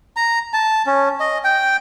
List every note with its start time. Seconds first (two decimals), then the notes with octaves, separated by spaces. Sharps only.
0.16 A#5
0.53 A5
0.86 C#4
1.20 D#5
1.44 G5